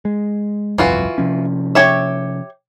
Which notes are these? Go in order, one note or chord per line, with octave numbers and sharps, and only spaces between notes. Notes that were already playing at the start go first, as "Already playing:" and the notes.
G#3
G1 C2 F2 E3 F4 F#4
C3 F3 C#4
G4 C#5 E5